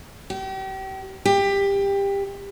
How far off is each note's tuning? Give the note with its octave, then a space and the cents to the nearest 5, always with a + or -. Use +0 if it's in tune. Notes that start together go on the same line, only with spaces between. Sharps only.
G4 -35
G4 +20